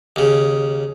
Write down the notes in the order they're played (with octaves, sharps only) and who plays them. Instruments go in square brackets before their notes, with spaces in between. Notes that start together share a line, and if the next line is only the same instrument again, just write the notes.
[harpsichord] D#2 C#3